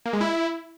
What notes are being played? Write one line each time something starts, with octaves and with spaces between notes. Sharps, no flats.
A#3
G#3
E4